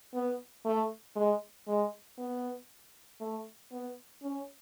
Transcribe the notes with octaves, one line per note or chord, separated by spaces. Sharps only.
B3
A3
G#3
G#3
B3
A3
B3
C#4